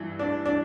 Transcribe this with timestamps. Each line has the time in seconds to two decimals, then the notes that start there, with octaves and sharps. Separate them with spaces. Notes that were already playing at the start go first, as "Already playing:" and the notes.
Already playing: G2 E3
0.19 D4
0.46 D4